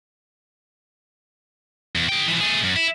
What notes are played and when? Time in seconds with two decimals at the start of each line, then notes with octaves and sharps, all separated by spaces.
1.96 E2
2.09 G#4 G5
2.27 E3 F3
2.41 A3 G#4
2.63 F#2
2.76 E4